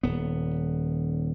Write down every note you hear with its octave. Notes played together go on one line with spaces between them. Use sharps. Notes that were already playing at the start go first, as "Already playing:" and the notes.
D#1 B3